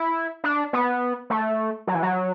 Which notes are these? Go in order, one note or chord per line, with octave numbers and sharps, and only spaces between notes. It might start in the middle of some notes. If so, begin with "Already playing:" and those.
Already playing: E4
D4
B3
A3
F#3
E3
F#3